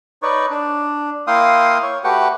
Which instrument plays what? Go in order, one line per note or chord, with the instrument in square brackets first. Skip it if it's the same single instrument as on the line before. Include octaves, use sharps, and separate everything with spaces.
[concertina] D#4 B4 C#5 D5
D4
A#3 E4 F5 G5 C6 D#6
C#5
A3 F#4 G4 B4 F#5 G5